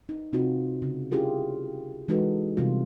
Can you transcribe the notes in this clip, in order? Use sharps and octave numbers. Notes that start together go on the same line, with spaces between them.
D#4
C3 C4 D#4 F4 F#4
C#3
C#4 E4 F4 G4 G#4 A#4
E3 G#3 D#4 F#4 A4 B4
C3 E3 G3 B3 F4